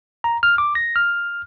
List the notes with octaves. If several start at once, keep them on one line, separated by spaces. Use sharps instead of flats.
A#5
F6
D6
A#6
F6